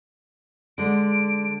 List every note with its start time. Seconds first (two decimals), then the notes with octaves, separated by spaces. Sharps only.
0.78 D3 G#3 D7